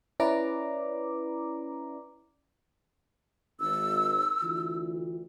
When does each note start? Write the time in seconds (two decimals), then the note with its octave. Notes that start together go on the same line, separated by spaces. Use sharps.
0.20 C#4 E4 B4 D5 A#5 D6
3.60 G#1 E6
4.43 D2 E3 F4